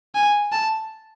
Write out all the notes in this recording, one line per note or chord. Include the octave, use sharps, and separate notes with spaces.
G#5
A5